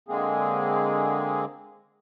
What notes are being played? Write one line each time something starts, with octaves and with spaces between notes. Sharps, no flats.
D3 G#3 A#3 C4 G#4